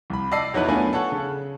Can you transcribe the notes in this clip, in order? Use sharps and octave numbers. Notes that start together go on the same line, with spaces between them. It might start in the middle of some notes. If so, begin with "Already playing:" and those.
C2 B5
D5 D#5 A5 E6 C7
E2 F#3 D#4 E4 B4 F#6
A3 B3 D4 F4 G#5
A4 C#5 F#5
C#3